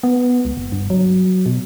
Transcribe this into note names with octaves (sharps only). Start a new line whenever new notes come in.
B3
C#2
F#1
G2
F#3
B2